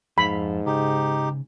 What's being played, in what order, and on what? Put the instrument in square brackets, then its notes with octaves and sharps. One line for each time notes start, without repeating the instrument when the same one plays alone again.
[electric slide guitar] F2 A4 F5 [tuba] G#2 [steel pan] B5
[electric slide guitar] C#3 [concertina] D#4 G4